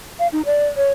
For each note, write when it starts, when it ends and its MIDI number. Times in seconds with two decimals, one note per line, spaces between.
0.19 0.27 77
0.32 0.42 63
0.46 0.66 74
0.77 0.92 73